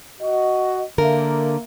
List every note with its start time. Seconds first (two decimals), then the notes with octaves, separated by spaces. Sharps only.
0.20 F#4 D#5
0.98 D3 A#3 A#4 E5